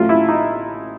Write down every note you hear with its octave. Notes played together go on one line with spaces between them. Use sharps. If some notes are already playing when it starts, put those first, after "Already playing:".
Already playing: A1 A2 F#3 F4
E4
D#4